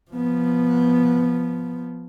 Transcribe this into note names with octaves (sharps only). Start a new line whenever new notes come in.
F3 B3